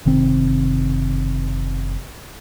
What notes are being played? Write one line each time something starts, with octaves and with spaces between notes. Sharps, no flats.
F#1 C3 D#3 C4